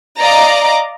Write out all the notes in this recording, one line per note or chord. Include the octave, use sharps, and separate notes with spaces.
D5 D#5 F5 A#5 D6